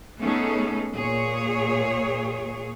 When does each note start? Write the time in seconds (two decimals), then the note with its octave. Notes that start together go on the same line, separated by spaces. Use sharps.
0.19 A3 B3 C#4 D#4 G#4 A4
0.97 A#2 G#4 C#5